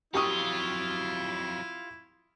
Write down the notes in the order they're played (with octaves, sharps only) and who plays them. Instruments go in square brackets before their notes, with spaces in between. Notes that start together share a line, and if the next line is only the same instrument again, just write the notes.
[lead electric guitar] F2 F#3 [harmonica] E4 [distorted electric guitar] F4 [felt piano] G4 C#6 D#6